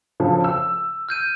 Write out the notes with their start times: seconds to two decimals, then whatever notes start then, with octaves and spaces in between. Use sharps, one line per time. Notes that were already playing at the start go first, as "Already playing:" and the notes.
0.20 C#3 F3 A4
0.44 E6
1.09 F6 G6 D#7